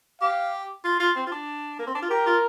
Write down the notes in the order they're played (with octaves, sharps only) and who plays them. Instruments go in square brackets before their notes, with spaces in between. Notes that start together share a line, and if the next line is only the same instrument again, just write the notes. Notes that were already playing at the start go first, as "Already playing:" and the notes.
[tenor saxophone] G4 [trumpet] F5
[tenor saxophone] F4
F4
C4
F4
D4
A#3
C4
D4
F4
[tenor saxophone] G4 [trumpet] A#4
[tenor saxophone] F4